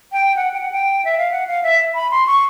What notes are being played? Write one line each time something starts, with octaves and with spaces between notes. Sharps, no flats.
G5
F#5
G5
F#5
G5
E5
F5
F#5
F5
E5
B5
C6
C#6